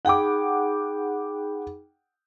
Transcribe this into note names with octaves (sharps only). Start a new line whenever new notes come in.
D#4 G#4 F#5 G5 B5 D6